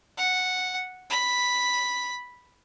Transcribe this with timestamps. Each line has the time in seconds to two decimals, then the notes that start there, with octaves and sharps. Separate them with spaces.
0.17 F#5
1.10 B5